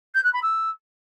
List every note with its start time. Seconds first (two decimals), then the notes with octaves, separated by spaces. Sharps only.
0.15 G6
0.24 F#6
0.33 B5
0.42 E6